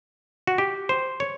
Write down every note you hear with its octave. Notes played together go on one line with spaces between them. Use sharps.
F#4
G4
C5
C#5